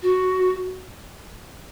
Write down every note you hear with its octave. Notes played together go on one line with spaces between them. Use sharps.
F#4